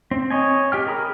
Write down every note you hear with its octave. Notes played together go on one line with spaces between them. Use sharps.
C4
C#5 D#5 G#5
G4 G5 F6
G#4 A#4 A#5 B5 D#6